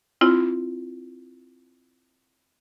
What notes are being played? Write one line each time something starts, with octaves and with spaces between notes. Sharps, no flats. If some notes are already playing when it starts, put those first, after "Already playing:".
C4 E4 F4